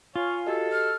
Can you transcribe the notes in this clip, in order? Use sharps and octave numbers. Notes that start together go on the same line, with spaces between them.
F4 C#5 F5 G#5
F#4 G4 A4 D#5
F6